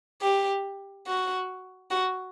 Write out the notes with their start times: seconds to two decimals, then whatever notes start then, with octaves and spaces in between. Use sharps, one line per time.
0.22 G4
1.07 F#4
1.91 F#4